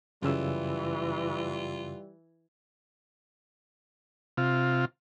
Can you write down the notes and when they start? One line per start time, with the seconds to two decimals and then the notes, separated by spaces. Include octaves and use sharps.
0.22 F#2 C#3 E3 G3 F4 E6
4.37 C3 F4